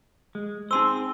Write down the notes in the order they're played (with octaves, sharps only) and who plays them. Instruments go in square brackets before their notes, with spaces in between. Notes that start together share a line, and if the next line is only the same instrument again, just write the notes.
[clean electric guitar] G#3
[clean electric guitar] C4 G#4 C5 [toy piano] D#4 C6 E6